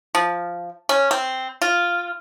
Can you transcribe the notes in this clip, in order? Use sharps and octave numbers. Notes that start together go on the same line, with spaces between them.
F3
C#4
C4
F4